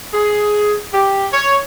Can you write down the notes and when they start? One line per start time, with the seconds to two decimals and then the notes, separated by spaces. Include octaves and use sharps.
0.13 G#4
0.93 G4
1.32 C#5